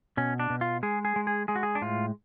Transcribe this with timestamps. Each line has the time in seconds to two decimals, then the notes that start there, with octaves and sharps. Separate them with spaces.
0.17 B2 C#4
0.40 D4
0.50 B2
0.61 F4
0.83 G#3 G#4
1.05 G#4
1.16 G#3
1.27 G#4
1.48 G#3 G#4
1.56 F#4
1.63 G#4
1.75 D4
1.82 A2 F4